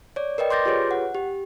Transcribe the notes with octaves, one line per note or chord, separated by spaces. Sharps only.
C#5 D5
A#4 B4 D5 D#5 G5
C6 D6 G6 A6 A#6
F4 G4 G#4 B4 C#5
F#5
G4